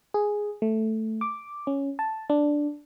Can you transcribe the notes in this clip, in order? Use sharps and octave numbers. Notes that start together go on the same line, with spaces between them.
G#4
A3
D6
C#4
A5
D4